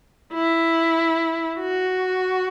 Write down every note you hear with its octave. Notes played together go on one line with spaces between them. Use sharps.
E4
F#4